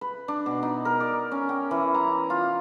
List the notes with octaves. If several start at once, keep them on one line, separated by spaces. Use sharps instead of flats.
B4
D4
B2
D#4
A#4
D5
C#4
G5
E3
A#5
F4